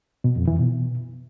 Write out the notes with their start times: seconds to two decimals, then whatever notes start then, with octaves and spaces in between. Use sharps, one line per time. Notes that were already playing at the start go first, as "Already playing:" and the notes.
0.24 B2
0.36 F2
0.47 E3
0.59 B2